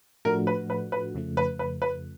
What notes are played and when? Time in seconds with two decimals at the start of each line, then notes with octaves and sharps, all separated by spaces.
0.25 A2 F3 A3 D4 F#4 A#4
0.47 B4
0.70 B4
0.92 B4
1.15 F2 C#3 F3 A3
1.37 B4
1.59 B4
1.82 B4